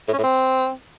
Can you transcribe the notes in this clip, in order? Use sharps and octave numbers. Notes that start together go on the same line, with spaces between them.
A2
C#4
A2
C4